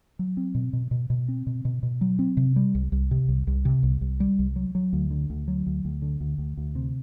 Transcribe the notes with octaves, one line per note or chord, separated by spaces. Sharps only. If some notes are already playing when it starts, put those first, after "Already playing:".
F#3
C4
B2
B2
B2
B2
C4
B2
B2
B2
F#3
C4
C3
G3
C2
C2
C3
C2
C2
C3
C2
C2
G3
C2
F#3
F#3
D2
D3
D2
F#3
D2
D2
D3
D2
D2
D2
C3